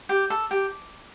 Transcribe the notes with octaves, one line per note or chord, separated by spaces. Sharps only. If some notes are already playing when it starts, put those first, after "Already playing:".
G4
A4
G4